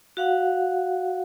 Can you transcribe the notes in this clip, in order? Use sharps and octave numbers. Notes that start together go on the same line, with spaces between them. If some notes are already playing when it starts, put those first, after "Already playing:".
F#4 F5 F#5